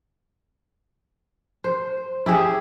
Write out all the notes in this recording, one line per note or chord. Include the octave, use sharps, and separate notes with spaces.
C5
E4 G4 G#4 E5